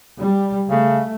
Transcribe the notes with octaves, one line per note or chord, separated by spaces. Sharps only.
G3
C#3 A3